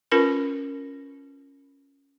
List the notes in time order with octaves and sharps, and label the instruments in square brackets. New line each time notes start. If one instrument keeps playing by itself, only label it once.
[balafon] C#4 F4 A#4 B4 B5